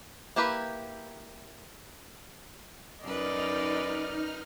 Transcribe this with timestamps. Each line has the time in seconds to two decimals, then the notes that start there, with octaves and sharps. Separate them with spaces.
0.36 A#3 E4 G4 B4
3.03 F#2 D#4 B4 D5 D#5 F6